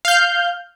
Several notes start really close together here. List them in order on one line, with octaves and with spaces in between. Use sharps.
F5 G6 F6